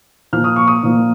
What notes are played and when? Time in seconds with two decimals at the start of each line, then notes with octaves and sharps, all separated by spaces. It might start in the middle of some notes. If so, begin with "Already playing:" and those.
0.33 A#2 F3 A#3 F6
0.44 D#6
0.56 C#6
0.68 D#6
0.83 A#2 F3 A#3